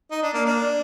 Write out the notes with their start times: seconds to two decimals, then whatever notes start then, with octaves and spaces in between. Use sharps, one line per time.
0.11 D#4
0.23 D4
0.34 A#3
0.46 A#3 D4